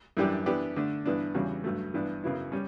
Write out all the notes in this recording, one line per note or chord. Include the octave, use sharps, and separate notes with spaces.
F#2 E3 G3 D4 G4
E3 B3 D4 G4
D3 A3 D4
G2 E3 B3 D4
E2 C#3 G3 C#4 F#4
G2 F#3 A3
G2 E3 B3 D4
F#2 C#3 F#3 B3 E4
G3 C#4